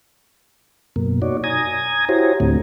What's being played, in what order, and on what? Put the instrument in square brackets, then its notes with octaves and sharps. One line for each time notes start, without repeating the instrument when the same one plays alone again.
[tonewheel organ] F#2 B2 A#3
D#4 F#4 C#5 D5
G#5 A#5 D#6 G#6
E4 F#4 G4 C5 C#5 A#5
D2 A2 D3 A3 C4